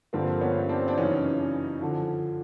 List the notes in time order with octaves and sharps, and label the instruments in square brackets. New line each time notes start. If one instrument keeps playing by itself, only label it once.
[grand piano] G2 D3 F3 A#3 C4
B3 C#4
C4 D4
D4
F#2 C#3 E3 C#4 D#4
D3 F3